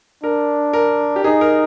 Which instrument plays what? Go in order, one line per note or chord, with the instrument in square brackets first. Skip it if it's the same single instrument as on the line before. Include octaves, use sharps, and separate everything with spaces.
[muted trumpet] D4 [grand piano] A#4
[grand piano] A#4
G4
[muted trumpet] D#4 [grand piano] G#4
[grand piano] A#4